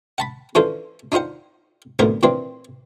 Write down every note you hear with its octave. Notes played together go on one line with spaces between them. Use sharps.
F#5 A5 B5
E3 C#4 D4 F4 A4 C5
D4 D#4 F4 C5 F#5
B1 F2 A2 D3 B3 A#4
A#2 E3 C4 D4